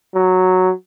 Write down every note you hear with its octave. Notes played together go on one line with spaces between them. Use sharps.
F#3